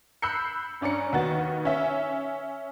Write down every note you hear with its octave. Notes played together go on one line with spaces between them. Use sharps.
B5 E6 F#6 G6 C7 C#7
G2 C#4 D5 A#5 C#7
D#2 D#3 B3 F#4 A6
C#4 E5